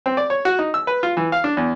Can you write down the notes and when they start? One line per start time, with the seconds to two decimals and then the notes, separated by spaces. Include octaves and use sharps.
0.06 C4
0.17 D5
0.30 C#5
0.45 F#4
0.59 D#4
0.74 E6
0.87 B4
1.03 F4
1.17 E3
1.32 F5
1.44 D4
1.57 E2